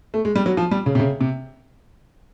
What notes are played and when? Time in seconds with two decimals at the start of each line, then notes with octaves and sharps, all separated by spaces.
0.14 A3
0.25 G#3
0.36 G3
0.46 F#3
0.57 F3
0.71 G3
0.86 C#3
0.95 C3
1.00 C#3
1.21 C3